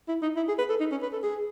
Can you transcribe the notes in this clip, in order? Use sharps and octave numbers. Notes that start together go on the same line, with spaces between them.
E4
D#4
E4
G#4
B4
A4
D#4
C#4
B4
A4
G#4